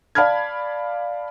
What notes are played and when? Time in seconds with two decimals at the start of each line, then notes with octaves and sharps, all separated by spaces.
0.15 D5 F5 A5 B5 F6 G#6